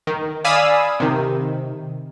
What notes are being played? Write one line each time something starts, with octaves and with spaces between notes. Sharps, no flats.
D#3
D5 F5 G#5 B5 D#6 E6
C3 D#3